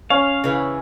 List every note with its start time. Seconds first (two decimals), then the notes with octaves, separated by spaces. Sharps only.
0.10 C#4 F5
0.44 C#3 E3